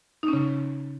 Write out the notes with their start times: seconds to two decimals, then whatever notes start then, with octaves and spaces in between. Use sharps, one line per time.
0.23 D#4
0.28 C#4
0.33 C#3